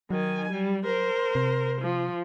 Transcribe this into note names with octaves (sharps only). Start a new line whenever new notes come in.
D#3 F#3 G#5
G3
A#4 C5
C3
F3